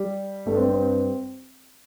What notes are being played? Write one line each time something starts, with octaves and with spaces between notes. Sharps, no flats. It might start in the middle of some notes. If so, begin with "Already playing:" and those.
Already playing: G3
G2 A3
C4
C4